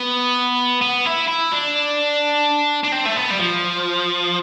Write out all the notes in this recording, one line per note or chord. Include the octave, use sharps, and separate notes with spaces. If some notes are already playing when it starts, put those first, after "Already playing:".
Already playing: B3
B3
E4
E4
D4
D4
C4
A3
B3
G3
F3